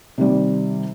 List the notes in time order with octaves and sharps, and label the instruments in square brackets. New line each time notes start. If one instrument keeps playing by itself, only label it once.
[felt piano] C3 D#3 G3